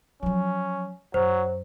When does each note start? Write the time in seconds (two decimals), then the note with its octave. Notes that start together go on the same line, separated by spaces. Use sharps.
0.23 F3 F#3 C#4
1.14 F#2 F#3 C5